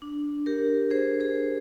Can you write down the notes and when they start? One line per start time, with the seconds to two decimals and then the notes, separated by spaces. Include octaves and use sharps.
0.02 D4
0.46 G4 A#4
0.91 G#4 C5
1.20 G#4 C5